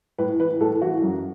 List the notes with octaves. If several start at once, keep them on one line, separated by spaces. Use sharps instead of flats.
A2 B4
E3 B4
A2 A4
E3 F#4
F#2